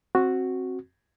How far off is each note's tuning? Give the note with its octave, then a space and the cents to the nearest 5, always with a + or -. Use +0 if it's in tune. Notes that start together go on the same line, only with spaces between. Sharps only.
C4 +15 F#4 +0